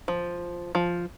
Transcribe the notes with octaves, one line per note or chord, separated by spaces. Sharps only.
F3
F3